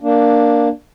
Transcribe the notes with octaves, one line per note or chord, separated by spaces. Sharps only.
A#3 D4